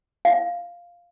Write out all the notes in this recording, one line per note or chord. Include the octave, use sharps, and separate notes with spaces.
F5